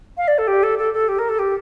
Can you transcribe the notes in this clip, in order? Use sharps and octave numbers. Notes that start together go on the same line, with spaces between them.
F5
D5
A4
G4
A4
A4
A4
G4
A#4
A4
G4